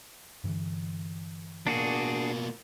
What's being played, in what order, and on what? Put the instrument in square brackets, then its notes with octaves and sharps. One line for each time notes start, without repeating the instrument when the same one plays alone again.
[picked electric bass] G2 D3 E3
[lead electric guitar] B2 A#3 [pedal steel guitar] D4 F#4 G#4